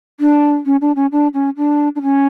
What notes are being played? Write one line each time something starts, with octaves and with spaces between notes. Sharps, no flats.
D4
C#4
D4
C#4
D4
C#4
D4
D4
C#4